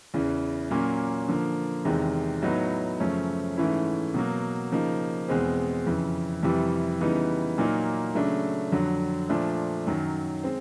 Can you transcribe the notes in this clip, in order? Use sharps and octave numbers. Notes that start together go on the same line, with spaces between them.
E2 C#3 E3
A#2 F#3 A#3 C#4
D3 F3 A#3
E2 C3 D#3 G#3
A2 F#3 B3 D#4
F#2 C#3 F3 A3 C#4
G#2 E3 A3 C#4 E4
B2 F#3 A#3
C#3 F3 A#3 D#4
E2 B2 G#3 C4
F2 C#3 E3
F2 C3 E3 G3
C#3 E3 G3 B3 D#4
A#2 F#3 A#3 D#4
C#3 F#3 A3 D4
F2 D3 F#3
A#2 F3 A3 D4
F#2 D#3 F#3
G#3 C4